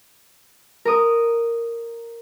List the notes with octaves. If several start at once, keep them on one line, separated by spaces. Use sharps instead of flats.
A#4 D#6